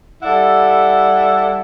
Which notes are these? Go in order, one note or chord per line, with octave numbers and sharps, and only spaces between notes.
G3 E4 A4 D5 F#5